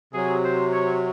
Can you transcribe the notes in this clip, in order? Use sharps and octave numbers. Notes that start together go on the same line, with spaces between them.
C3 F#3 G#4
C5
C#5